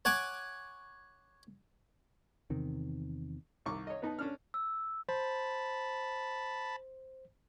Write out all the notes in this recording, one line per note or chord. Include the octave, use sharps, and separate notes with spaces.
C#5 F#5 G#5 D6
E2 C3 D#3
C2 D#3 C#6 D6
C#5 D#5
B3 D#4 A5
C#4 D4 F6
E6
C5 A5 B5